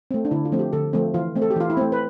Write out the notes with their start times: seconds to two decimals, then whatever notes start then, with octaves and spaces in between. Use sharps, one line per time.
0.11 A3 C4
0.25 D4
0.31 D3 E4
0.45 F4
0.52 F3 A3 C4
0.59 G4
0.73 D3 A4
0.93 F3 A3 C4
1.14 E3 F4
1.35 A3 C4
1.42 A4
1.50 G4
1.56 E3 F4
1.70 E4
1.77 A3 C4
1.92 B4